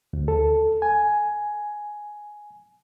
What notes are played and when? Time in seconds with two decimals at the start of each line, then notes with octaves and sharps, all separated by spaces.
0.13 D2
0.28 A4
0.82 G#5